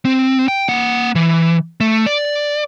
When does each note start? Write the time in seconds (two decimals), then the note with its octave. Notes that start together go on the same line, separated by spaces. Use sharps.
0.05 C4
0.48 G5
0.68 A#3 F#5
1.15 E3
1.80 A3
2.06 D5